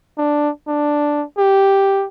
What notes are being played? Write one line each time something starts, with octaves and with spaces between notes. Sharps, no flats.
D4
D4
G4